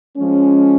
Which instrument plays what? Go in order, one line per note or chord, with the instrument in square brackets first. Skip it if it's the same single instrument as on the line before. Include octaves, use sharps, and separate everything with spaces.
[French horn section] F3 G#3 C#4